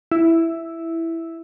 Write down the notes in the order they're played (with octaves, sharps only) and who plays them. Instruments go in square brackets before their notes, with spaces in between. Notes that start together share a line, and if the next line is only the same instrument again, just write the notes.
[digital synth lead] E4